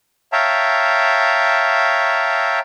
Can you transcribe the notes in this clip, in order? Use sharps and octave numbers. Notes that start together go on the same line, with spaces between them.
C#5 E5 F5 G5 A5 A#5